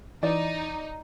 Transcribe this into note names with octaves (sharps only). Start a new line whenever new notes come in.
E3 D#4 D5